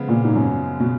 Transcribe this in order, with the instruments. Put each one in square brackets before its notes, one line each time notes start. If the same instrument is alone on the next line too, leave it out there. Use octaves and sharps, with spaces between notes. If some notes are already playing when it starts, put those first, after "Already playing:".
Already playing: [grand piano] C#3 F3 G#3 B3
[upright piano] A#2
G#2
F#2
B2